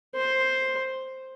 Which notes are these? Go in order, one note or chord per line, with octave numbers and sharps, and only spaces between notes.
C5